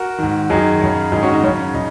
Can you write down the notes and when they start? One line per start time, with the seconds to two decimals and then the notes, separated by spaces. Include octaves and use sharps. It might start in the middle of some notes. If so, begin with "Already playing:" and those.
Already playing: F#4 A#4
0.18 G#2 D#3
0.50 F#2 D#3 D#4 G#4
0.81 F#2 C#3
1.12 G#2 D#3 D#4 G#4
1.23 C#4 F#4
1.33 D#4
1.44 F#2 C#3 C#4
1.74 C#3 D#4